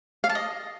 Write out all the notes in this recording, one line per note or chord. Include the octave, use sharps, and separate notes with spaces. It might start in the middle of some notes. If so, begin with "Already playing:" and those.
F5
A5
D#5